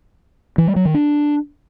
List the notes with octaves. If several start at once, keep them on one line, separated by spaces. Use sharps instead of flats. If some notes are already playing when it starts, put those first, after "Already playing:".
E3
G3
F#3
D#3
D4